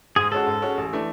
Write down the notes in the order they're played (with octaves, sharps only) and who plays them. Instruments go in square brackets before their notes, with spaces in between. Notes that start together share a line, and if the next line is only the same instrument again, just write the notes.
[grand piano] G#2 [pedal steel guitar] G#4
[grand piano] G#3 C#4 F#4 [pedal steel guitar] A4
[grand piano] G#2
G#3 C#4 F#4
A1
E3 A3 D4